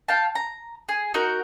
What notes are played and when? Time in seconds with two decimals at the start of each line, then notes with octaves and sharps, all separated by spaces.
0.08 F5 G5 A5
0.35 A#5
0.89 G#4
1.14 D#4 F#4 A#4 F#5